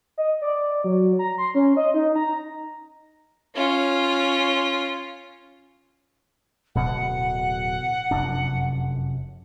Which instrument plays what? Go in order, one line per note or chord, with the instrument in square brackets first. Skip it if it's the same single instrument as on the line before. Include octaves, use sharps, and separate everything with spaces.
[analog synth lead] D#5
D5
F#3
A#5
C6
C#4
D#5
D#4
A#5
[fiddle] C#4 F4
[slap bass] D1 B2 [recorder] F#5
[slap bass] F1 F#2 D4